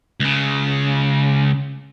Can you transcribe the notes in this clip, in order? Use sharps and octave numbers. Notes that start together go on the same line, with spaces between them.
C#2 C#3